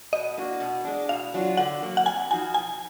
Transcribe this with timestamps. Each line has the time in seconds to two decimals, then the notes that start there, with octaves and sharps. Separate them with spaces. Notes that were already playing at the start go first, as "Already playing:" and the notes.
0.13 B2 D#5
0.37 A#3 D4 F#4
0.60 B2
0.85 G#3 D4
1.09 B2 F5
1.34 F#3 D4 F4
1.57 D3 F#5
1.82 F#3 A#3
1.97 F#5
2.06 F2 G#5
2.30 F3 B3 D#4 F#4 G#5
2.54 B2 G#5